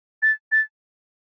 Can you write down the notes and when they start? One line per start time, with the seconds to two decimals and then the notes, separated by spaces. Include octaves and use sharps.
0.22 A6
0.52 A6